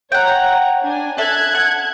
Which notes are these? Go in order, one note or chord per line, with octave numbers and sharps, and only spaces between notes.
C#5 F#5 G5 A#5
D4 G#5
A4 E5 A5 F#6 G#6
F#5